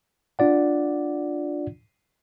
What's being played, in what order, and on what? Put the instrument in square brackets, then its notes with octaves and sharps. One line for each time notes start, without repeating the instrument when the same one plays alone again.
[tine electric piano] D4 F4 D5 F#5